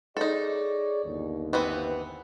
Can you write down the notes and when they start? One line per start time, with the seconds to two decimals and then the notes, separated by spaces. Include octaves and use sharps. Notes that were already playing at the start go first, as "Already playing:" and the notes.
0.17 D#4 G#4 A4 C#5 D5
1.04 G1 D#2
1.53 E3 B3 C4